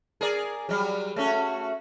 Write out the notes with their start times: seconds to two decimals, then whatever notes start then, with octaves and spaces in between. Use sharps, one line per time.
0.21 G#4 A#4 D5
0.69 F#3 G3
1.16 A3 C#4 F#4